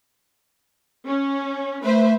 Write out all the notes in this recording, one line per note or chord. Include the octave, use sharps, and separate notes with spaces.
C#4
A3 B4 C5 E5